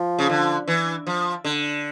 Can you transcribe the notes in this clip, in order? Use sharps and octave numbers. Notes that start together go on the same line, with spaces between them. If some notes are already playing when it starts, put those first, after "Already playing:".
Already playing: F3
C#3
D3
E3
F3
D3